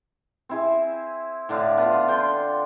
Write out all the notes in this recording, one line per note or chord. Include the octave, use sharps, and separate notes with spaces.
C4 E4 G#4
A2 D3 D4 F5
B3 F4
D3 G5 C6